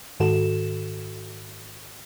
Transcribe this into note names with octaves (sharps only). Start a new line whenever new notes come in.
G#2 D#3 F#4 A4 E7